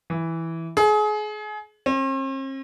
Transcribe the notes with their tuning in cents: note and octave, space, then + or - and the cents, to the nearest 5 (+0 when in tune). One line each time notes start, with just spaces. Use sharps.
E3 -5
G#4 +30
C4 +45